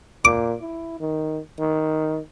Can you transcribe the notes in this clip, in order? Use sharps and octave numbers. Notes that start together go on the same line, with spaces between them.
A#2 D6
E4
D#3
D#3